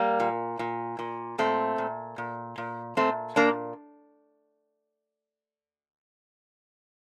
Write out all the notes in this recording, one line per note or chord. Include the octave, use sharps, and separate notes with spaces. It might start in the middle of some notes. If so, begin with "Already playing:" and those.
Already playing: G3 A#3
A#2
A#2
A#2
A#2 A3 C4
A#2
A#2
A#2
A#2 A3 C4
A#2 A#3 D4